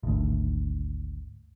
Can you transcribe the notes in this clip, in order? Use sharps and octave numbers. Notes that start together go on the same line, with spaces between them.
G#1 D2